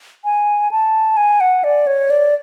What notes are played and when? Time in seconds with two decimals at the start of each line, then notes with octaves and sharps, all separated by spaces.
0.24 G#5
0.71 A5
1.17 G#5
1.40 F#5
1.64 D5
1.87 C#5
2.10 D5